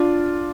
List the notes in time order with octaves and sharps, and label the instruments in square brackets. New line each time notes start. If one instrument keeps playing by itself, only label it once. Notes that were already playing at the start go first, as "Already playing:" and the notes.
Already playing: [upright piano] D4 F4